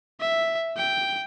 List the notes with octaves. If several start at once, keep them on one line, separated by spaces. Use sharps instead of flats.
E5
G5